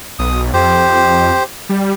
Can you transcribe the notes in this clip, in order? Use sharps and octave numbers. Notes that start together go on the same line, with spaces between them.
B1 D#6
F2 G4 C5
G3